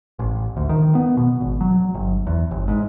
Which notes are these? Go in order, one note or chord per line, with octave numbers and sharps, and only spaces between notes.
A1
D2
D#3
B3
B2
G#1
F#3
G1
E2
G1
G#2